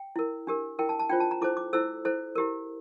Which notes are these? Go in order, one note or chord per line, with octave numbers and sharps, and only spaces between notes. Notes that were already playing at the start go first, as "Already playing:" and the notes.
Already playing: G5
E4 A#4
D4 G4 A#4
E4 A#4 G5
A5
A5
D4 F4 C5 G5
A5
A#5
E4 A4 C5 D6
D6
E4 A4 C5 E6
E4 A4 C5
E4 G4 A#4